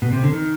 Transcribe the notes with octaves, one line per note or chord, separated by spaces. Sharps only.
B2
C3
D3
D#3